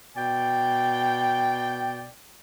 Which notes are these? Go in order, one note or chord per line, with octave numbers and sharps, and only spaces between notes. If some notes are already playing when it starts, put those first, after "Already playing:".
B2 D5 G5